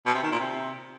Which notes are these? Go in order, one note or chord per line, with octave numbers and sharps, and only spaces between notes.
B2
C3
D#3
A#2
C3